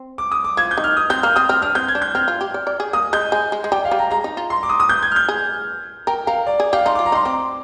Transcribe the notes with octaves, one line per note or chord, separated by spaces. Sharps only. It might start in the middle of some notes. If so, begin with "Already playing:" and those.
Already playing: C4
D6
D#6
D6
F3 G#6
G6
D#3
F6
D#6
C4 G6
A#3 F6
C4 D#6
C4 F6
D4 F6
C4 G6
G#6
D4
G6
C4 F6
F4
G4
D5
D5
G#4
A#3 D#6
G#3 G6
G#3 G#5
G#3
G#3
G3 G5
F5
G3
A#5
G#3 A#5
D#4
F4
C6
D6
D#6
D#6
G6
G#6
F6
G6
G#4
A#4 G5
A#4 F5
D5
G#4
G4 F5
D#4 C6
F4 D6
A#5
D#4 C6
C4 D6